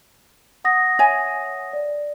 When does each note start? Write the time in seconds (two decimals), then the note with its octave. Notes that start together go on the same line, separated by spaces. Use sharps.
0.64 F#5 D#6 A#6
0.99 C#5 E5 G#5
1.73 D5